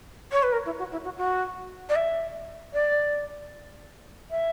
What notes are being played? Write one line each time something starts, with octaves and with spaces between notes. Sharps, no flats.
C#5
B4
A#4
E4
F#4
E4
F#4
F#4
D5
E5
D5
E5